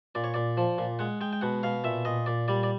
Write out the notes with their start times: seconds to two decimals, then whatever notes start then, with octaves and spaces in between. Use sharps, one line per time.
0.15 A#2 D5
0.24 C#5
0.34 A#2 D5
0.57 F3
0.78 A#2
0.99 G#3 F#5
1.21 G#3 G5
1.33 G5
1.41 B2 F#5
1.63 B2 F5
1.84 A#2 E5
2.05 A#2 D#5
2.26 A#2 D5
2.48 G3 D5
2.63 D5